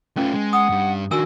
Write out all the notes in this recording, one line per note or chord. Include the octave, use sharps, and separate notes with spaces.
A3 C#4 F4 B4
G#3
F#5 D#6
G2 G3
D#3 D4 F#4 A#4 G#5 E6